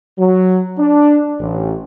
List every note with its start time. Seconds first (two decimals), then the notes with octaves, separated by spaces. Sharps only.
0.18 F#3
0.78 D4
1.39 A1